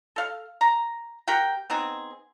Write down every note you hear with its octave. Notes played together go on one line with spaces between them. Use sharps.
A4 F5
A#5
G4 A#4 F#5 G5
B3 C4 D#4 G#4